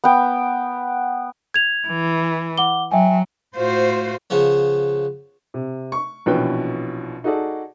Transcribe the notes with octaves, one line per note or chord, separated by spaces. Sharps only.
B3 G5
G#6 F7
E3
F#5 D6 G7
F#3 E5 G5 G#5
A2 F4 F#4 C5
C#3 F3 B3
C3
C#6
A#1 B2 E3 C#4 B4 G5
D#4 F#4 G#4 A4 D5